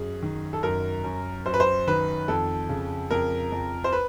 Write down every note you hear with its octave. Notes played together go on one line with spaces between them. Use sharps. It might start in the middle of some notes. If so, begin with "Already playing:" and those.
Already playing: F#2 G#4
D#3
A4
F#2 A#4
F#2
F#2 C5
B4
C5
D#3 B4
F2 A4
C#3
F2 A#4
F2
C5
B4